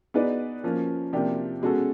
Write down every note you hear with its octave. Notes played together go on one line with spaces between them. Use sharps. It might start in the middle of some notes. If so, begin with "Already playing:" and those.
B3 D#4 G#4 B4 D5
F3 A#3 C#4
C3 F3 A#3 D4 G4
B2 G#3 C#4 F#4 A4